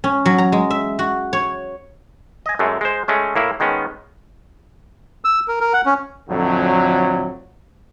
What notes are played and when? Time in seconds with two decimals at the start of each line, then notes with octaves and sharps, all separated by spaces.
0.04 C#4
0.26 F#3
0.38 A#5
0.52 G#3
0.70 E5
0.99 F#4
1.33 C#5
2.46 D#5 G#5
2.59 F#2 G#3 A3
2.81 G#3 C5
3.08 G#3 A3 C#4
3.36 A2 A#3 E4
3.60 D#3 G#3 B3 C#4
5.25 E6
5.48 A#4
5.61 A#4
5.73 F#5
5.86 C#4
6.29 F2 A2 D3 F#3